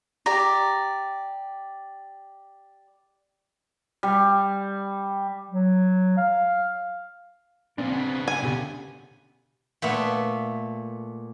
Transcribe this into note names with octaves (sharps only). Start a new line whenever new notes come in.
G4 D5 A#5
G3
F#3
F5
A#2 F3 C4 D4
C#3 B3
G#5
B2 D3 G4
A#2 A3 B3